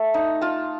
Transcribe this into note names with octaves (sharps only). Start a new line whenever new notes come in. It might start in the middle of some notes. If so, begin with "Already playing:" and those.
Already playing: A3
D#4
F4 A5